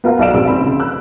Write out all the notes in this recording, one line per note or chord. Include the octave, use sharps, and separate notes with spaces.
B3 F4 A#4 F5 F#5
B1 F#4 D5 F5 D7 E7
A#1 G#2 C3 G#3 C4 E6
C4 B5
C#3
E6 F#6